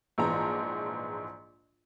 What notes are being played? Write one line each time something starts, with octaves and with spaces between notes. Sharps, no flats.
A#1 G#2 E3 A5 A#5